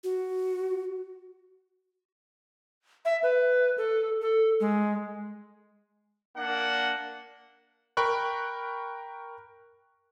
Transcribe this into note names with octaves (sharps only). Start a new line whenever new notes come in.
F#4
E5
B4
A4
A4
G#3
A#3 D4 F#5
A#4 G5 B5 C#6 F#6